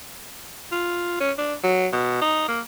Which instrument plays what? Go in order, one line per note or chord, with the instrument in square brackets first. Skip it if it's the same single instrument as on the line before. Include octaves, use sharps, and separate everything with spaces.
[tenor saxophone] F4
C#4
D4
F#3
B2
D#4
A#3